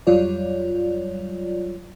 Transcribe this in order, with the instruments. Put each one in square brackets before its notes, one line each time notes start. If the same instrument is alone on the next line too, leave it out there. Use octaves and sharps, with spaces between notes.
[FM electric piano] F2 F#3 G3 F4 C#5 D5